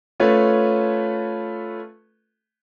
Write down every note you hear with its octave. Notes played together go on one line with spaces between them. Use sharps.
A3 C#4 F4 A4 B4 C#5